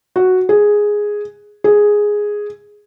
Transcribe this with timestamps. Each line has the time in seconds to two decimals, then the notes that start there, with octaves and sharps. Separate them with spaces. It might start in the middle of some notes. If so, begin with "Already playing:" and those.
0.16 F#4
0.49 G#4
1.64 G#4